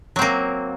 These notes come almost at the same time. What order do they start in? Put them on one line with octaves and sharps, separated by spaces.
F#3 C4 A#3